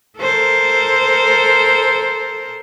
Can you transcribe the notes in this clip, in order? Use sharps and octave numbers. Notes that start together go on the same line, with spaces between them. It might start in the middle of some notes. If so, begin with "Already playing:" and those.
A4 A#4 C5